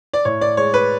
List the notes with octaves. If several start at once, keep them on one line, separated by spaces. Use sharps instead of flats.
D5
A2 C#5
D5
G#3 C#5
B4